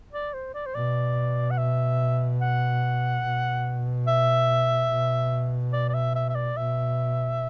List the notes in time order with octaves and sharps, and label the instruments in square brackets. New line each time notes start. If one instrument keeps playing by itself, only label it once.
[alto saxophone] D5
C5
D5
C5
[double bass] B2 [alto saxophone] D5
[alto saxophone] F#5
E5
F#5
[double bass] B2
[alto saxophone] E5
[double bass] B2
[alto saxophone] D5
D5
E5
E5
E5
D5
[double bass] B2 [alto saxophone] E5